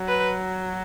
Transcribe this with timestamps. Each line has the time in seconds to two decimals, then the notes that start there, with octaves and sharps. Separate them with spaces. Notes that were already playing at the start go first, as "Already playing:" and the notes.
Already playing: F#3
0.08 B4